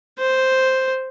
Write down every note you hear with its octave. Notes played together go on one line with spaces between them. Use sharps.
C5